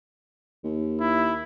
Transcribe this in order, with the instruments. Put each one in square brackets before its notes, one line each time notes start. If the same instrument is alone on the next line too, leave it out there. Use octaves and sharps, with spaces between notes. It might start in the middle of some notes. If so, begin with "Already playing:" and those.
[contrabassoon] D#2
[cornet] E4